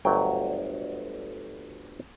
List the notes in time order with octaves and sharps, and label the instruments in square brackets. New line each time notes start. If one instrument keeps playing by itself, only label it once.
[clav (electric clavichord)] G1 D2 F#3 G5